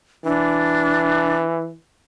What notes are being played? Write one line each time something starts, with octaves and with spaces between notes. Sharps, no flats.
E3 D4